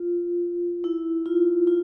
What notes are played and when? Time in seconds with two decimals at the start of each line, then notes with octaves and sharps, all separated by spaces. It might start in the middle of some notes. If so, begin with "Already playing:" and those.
Already playing: F4
0.84 E4
1.26 F4
1.67 F4